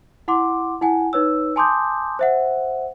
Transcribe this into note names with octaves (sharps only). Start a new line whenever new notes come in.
E4 F#5 C6 D6
E4 F#5 G#5
D#4 B4 C#5 E6
G#5 A5 C6 D6 D#6 G6
C5 E5 F#5